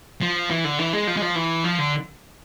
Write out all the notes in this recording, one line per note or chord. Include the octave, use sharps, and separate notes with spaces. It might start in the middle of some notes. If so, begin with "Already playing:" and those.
F3
E3
D3
E3
G#3
F3
G#3
F3
E3
F3
D3